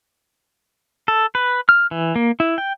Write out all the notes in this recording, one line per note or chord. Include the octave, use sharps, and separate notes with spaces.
A4
B4
F6
E3
A#3
E4
G5